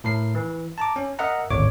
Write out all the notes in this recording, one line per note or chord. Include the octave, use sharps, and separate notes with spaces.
A2 A#4 C7
E3
A5 A#5 D6
C#4
A#4 D#5 E5 F#5 A#5
G#1 D2 A2 C#5 D6